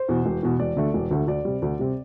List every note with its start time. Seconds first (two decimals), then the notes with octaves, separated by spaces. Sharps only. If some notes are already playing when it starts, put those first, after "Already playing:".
Already playing: C5
0.09 E2 B2
0.26 E1
0.43 E2 B2
0.60 E1 D5
0.77 D2 D3 A3
0.94 E1
1.11 D2 D3 A3
1.27 D2 D5
1.45 C3 G3
1.62 D2
1.79 C3 G3